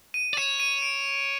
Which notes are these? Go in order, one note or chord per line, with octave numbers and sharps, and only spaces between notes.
D#7
D5
C#5 E7
D#7
D7